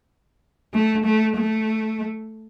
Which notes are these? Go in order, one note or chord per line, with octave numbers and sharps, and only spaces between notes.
A3
A3
A3